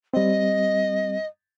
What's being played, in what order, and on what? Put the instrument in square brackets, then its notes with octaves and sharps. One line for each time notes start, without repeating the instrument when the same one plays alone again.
[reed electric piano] G3 C4 [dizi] D#5